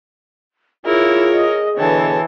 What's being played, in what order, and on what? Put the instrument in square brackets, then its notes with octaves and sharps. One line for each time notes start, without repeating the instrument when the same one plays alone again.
[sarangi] E4 [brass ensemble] F4 [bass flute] G#4 [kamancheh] A#4 C#5
[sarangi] D#5
[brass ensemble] B2 D3 [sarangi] E3 [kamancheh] C#5 A5